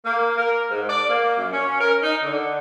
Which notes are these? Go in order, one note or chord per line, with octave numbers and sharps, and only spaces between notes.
A#3
A#4
G#2
D5
A#3
F#2
C#4
A#4
D#4
D3